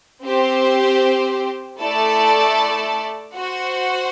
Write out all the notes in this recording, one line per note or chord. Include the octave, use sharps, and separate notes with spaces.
C4 G4 C5
A3 E4 A4 D5 A5
F#4 C5 F#5